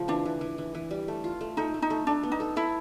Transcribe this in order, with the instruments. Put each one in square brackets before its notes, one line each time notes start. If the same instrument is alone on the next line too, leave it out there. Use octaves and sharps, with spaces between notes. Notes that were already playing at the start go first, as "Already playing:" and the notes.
Already playing: [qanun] C#3 F3 A3
[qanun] E3 [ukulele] D4
[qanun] E3
E3
E3
E3
G3
A3
F4
A3
[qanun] A3 [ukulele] D#4
[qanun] A3
[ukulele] D#4
[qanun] A3
[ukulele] D4 [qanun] A4
[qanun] B3
[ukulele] D#4
[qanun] A4
[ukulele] E4 [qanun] A4